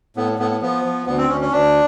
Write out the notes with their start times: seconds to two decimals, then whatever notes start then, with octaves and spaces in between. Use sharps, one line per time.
0.16 A2 B3
0.39 A2 B3
0.51 B3
0.62 F3 B3
0.85 F3
1.06 D2 B3
1.18 C4
1.29 D2 C#4
1.41 C#4
1.52 D2 D4